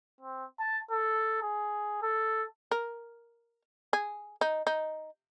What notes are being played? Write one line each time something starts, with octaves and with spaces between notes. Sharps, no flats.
C4
A5
A4
G#4
A4
A#4
G#4
D#4
D#4